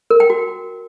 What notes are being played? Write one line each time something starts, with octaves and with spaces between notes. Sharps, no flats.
A#4
G5
F#4